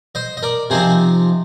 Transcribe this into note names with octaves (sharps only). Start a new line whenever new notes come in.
C5 D#5
D#5
A#4 D5
C3 F3 C4 D#4 G#4 C5